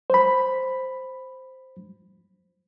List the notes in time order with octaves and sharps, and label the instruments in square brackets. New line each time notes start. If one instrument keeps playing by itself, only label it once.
[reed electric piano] C5 B5